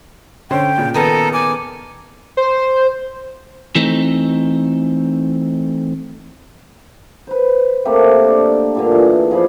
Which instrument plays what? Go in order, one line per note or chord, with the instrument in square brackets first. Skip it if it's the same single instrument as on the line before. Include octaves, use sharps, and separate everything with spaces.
[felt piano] D3 C#4 C5 [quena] G5
[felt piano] A#2 C#3
[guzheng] D#3 B3 A5 [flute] A4 [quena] A#5
[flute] G#5 [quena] D6
[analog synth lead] C5
[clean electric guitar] E3 A3 C4 D#4
[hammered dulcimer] B4 C5
A3 A#3 C4 G4
D4 D5
G2 A#2 D3
E3 G#4
F3 G#4 D5 B5